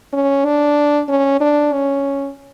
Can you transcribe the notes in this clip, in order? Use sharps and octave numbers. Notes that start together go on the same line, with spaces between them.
C#4
D4
C#4
D4
C#4